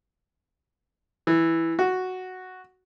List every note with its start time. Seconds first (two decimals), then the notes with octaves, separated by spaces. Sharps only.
1.27 E3
1.79 F#4